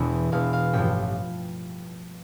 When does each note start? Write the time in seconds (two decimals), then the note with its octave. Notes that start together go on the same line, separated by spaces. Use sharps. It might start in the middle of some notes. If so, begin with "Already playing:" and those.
Already playing: E1 E2 B2 E3 B3
0.32 E1 E2 B2 B3 F5
0.53 F5
0.73 A1 G2 F3 G5